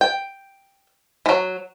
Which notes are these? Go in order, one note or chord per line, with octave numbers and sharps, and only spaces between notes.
G5
E3 F#3